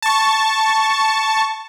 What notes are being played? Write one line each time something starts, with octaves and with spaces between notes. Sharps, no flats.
A5 C#6